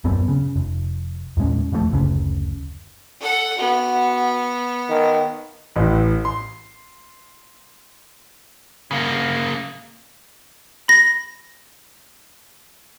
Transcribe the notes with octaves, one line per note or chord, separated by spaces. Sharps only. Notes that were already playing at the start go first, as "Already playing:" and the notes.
D#1 F#2 B3 C4
C#3
F1
E2 A#2 G#3 C#4
E1 F2 C3 A3
F#1 D2 C#3
A4 F#5
B3 F#4
D#3
A1 A2
C6
C#3 A#3
B5 A#6